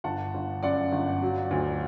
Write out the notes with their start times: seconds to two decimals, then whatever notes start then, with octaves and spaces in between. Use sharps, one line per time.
0.04 G1 F#5 A5
0.34 G1
0.63 F#2 D5 F#5
0.92 G1
1.22 F#3
1.51 D2